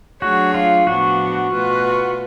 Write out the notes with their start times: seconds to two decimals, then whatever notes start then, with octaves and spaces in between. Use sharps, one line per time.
0.21 F#3 A3 D4 F#4 G#4 C#5
0.54 F4
0.87 A2 F3 B3 D4 F#4
1.52 B2 A3 F4 B4